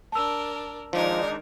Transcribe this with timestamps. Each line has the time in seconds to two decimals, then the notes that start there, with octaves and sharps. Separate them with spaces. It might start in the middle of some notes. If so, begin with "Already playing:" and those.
0.12 D4 A#4 A5 E6
0.93 D#3 F3 G#3 D4 D#4 A#4 G#6